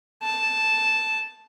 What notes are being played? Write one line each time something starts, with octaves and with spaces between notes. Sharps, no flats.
A5